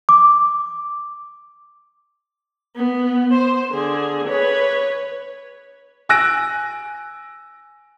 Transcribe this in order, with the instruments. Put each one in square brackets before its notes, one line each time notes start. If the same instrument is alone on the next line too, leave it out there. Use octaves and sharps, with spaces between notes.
[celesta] D6
[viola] B3
C5
D3 G#4
B4 C#5
[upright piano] G#5 E6 F#6 A#6 D7